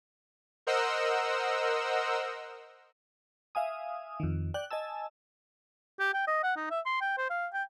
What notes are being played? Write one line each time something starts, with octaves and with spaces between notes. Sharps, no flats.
A#4 C5 D#5 F#5 E6
E5 F5 G#5 D#6
F2 D#3
D5 G5 F#6
D#5 G#5 A5 E6
G4
G5
D#5
F#5
D#4
E5
C6
G5
C5
F5
G5